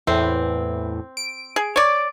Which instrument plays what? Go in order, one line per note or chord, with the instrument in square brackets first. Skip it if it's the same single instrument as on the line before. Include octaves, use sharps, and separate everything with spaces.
[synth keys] E2 A2 E3 [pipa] C4
[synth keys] D7
[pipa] G#4
C#5 D5